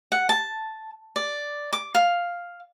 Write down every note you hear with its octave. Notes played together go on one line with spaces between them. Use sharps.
F#5
A5
D5
D6
F5